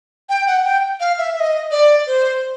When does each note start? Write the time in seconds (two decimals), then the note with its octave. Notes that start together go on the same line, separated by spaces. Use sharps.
0.29 G5
0.47 F#5
0.64 G5
1.00 F5
1.18 E5
1.36 E5
1.40 D#5
1.71 D5
2.07 C5